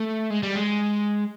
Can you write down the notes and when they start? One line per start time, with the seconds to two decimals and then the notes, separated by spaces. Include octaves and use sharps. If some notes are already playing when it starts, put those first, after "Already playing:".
Already playing: A3
0.30 G#3
0.43 G3
0.55 G#3